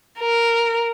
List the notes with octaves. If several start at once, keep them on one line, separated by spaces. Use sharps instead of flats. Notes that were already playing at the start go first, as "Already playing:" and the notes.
A#4